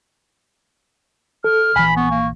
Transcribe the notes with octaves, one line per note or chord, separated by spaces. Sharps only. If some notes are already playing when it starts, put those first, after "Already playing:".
A4 F6
A#1 E3 G#5 B5
B3 C#6
A#3